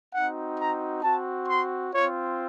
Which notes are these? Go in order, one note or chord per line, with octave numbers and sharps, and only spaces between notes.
C4 D#4 F#4 F#5
A#5
C4 F#4 A5
C6
C4 F4 C#5